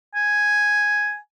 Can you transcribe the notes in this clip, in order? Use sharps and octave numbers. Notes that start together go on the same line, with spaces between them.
G#5